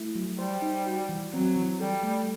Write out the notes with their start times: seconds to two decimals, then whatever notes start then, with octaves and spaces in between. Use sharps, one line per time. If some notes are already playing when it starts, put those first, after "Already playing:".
Already playing: A3 E4
0.15 F#3
0.39 G3 C5
0.62 D#4
0.86 F#4
1.09 E3
1.33 F#3 C4
1.56 E3
1.80 G3 A4
2.03 A3